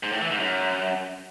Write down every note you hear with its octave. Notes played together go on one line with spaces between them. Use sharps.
G#2
A2
E3
G#2
F#2